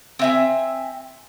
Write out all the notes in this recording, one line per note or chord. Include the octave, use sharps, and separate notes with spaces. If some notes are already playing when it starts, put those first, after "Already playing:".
C4 E5 G#5